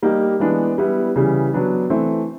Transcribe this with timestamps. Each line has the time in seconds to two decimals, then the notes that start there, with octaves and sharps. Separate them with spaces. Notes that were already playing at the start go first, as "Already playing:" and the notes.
0.03 G3 A#3 D#4 G4
0.40 E3 G#3 B3 D4
0.78 G3 B3 E4
1.16 C#3 E3 G3
1.54 F#3 B3 D4
1.90 E3 A3 C4